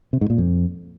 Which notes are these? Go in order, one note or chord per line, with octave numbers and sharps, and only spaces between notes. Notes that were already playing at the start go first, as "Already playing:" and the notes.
C3
G#2
A#2
F2